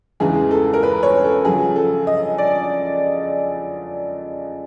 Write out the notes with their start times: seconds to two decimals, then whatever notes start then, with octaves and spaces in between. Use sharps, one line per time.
0.20 E2 C#3 E3 G#3 G#4
0.51 A4
0.74 A#4
0.83 B4
1.03 C#5
1.24 A4
1.45 F2 C#3 F#3 G#4
1.76 A4
2.07 D#5
2.38 D5